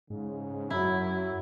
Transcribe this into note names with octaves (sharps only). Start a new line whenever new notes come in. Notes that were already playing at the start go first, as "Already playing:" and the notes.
G#2 C#3
F#2 F#3 E4